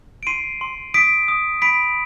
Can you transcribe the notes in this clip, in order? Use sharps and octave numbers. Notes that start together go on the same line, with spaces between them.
D7
C6 C7 D#7
C6
D#6 B6 D7
D#6
B5 B6 D7